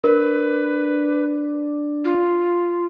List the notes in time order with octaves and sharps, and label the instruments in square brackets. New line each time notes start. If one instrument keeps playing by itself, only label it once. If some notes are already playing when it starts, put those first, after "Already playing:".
[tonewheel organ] D4 [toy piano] A#4 [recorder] B4
[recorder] F4